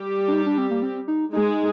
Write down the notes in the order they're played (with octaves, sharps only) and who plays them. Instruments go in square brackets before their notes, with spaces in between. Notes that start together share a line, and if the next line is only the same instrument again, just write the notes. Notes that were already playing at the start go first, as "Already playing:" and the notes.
Already playing: [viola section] G3 G4
[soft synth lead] D4
D#4
D4
C4
A#3
C4
D#4
[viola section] G#3 G#4 [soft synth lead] D#4